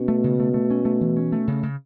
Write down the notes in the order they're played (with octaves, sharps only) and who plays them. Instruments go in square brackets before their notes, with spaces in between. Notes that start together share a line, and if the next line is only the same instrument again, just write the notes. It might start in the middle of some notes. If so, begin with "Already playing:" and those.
Already playing: [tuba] B2 [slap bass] C#4
[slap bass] A3
C#3
A3
A3
C#4
A3
E3
C#4
A3
C#3
C#3